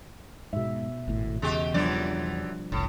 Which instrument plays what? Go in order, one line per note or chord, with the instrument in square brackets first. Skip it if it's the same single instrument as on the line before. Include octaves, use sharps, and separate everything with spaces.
[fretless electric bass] G#2 [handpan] B2 E5
[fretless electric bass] G#1 A2
[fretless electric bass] E2 C#3 [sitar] G#3 F#4 G4
[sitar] F#2 E3 D5 [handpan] F3 G3 D4
[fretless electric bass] F#1 C2 [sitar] A2